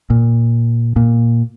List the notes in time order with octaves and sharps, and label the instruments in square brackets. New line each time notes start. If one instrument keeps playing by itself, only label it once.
[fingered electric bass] A#2
A#2